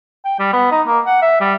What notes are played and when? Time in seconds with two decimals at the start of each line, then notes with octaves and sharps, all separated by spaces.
0.25 G5
0.39 G3
0.53 B3
0.71 D#4
0.87 A#3
1.06 F#5
1.22 E5
1.41 G3